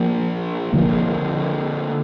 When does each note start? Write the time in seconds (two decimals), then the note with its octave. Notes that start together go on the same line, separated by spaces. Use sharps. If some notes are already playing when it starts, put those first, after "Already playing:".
Already playing: F3 A#3 D4
0.74 D3 F3 A#3